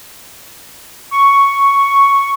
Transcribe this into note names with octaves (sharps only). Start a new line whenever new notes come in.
C#6